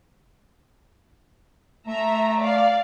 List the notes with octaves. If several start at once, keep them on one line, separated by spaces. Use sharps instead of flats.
A3 E5 A#5
D5 F5